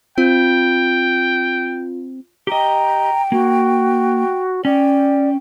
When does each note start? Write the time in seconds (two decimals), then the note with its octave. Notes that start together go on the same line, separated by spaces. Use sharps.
0.18 C4 F4 G5
2.47 G4 D#5 G5 A#5
3.32 A#3 F#4
4.65 C#4 D5 G5